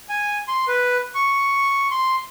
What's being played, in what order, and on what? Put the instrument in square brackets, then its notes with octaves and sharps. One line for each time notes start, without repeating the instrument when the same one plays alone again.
[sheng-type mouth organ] G#5
C6
B4
C#6
C6